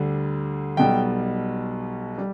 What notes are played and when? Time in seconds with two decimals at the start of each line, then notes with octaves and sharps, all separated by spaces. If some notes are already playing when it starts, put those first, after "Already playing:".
Already playing: D2 D3 G3
0.77 B1 B2 G3 G5
2.18 G3